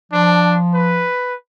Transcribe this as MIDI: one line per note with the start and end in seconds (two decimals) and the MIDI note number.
0.12 1.05 53
0.12 0.55 62
0.74 1.34 71